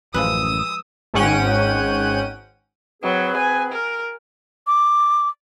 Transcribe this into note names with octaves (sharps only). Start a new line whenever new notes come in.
A1 F#2 F3 G#3 B4 D#6 E6
G#1 G#2 C#4 F#5 G5 D#7
F#3 C4 G#4 B4
G#5
A#4
D6